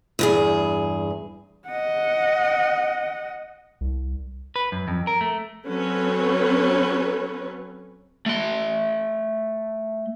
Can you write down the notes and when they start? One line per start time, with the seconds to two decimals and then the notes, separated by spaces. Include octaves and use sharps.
0.19 E2 G2 G#4
1.68 D#5 F#5
3.81 C2
4.56 B4
4.72 F#2
4.88 F2
5.07 A#4
5.21 A3
5.68 F#3 C4 C#4 A4 B4 C#5
8.26 A3 C6